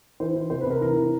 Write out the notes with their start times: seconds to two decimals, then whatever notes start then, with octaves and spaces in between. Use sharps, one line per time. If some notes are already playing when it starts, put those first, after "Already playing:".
0.20 E3 C5
0.35 E3
0.50 C3 C5
0.61 B4
0.67 C3 A#4
0.81 E3 A#4
0.97 E3